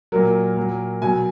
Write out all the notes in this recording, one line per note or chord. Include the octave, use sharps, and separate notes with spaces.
A#2 F#3 A#4
A#2 F#3
B2 F#3 G#5